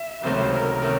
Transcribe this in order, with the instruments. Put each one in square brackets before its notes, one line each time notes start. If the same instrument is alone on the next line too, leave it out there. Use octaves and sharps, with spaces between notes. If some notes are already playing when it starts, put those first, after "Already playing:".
Already playing: [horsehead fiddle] E5
[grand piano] C#2 C3 D#3 F#3 A3 [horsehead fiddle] C5
[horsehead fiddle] A#4
[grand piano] C3 D#3 F#3 A3